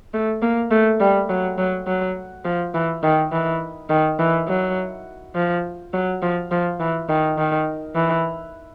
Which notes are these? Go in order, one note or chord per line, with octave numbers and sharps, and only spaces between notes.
A3
A#3
A3
G3
F#3
F#3
F#3
F3
E3
D#3
E3
D#3
E3
F#3
F3
F#3
F3
F3
E3
D#3
D#3
E3